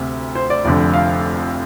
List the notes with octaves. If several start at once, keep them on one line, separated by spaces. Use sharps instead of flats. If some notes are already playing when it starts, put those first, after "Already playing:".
Already playing: D2 C3
C5
D5
F1 F2 D3 D5
F5